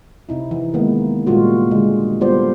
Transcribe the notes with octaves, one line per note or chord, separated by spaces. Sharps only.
C3 D#4 E4
E3
D#3 G#3 A#3 B3
A#2 C#3 G3 G#3 F4 F#4
D3 G#3
G3 B3 F4 A4 C5 D5